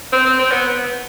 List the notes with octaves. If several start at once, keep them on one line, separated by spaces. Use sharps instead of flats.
C4
C4
C4
B3